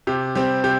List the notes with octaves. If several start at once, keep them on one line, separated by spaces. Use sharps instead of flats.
C3 G4
G3 C4 G4
C3 G4 C5